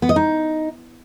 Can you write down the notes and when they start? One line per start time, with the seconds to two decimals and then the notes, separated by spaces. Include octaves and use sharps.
0.02 B3
0.09 D#5
0.16 D#4